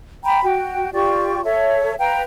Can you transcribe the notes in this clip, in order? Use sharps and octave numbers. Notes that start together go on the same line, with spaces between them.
G5 A#5 B5
F#4 G5
F4 G4 D5 C#6
A4 C#5 E5
B4 F5 G5 A#5